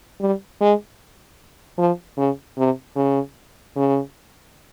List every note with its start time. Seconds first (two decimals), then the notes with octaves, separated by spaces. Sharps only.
0.21 G3
0.61 G#3
1.78 F3
2.17 C#3
2.58 C3
2.96 C#3
3.76 C#3